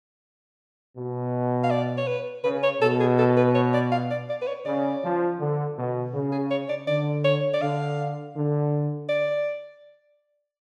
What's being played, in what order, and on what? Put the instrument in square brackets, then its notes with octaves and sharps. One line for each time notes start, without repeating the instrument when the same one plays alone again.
[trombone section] B2
[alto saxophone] F5
D5
C#5
B4
[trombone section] C#3 [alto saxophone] B4
[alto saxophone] C#5
[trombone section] B2 [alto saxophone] A4
[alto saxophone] G#4
A4
B4
C#5
D5
F5
D5
D5
B4
C#5
[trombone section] C#3 [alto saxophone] D5
[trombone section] F3
D3
B2
C#3
[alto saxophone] G#4
C#5
D5
[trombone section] D3 [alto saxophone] D5
[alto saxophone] C#5
D5
[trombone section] D3 [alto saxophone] F5
[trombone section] D3
[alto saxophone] D5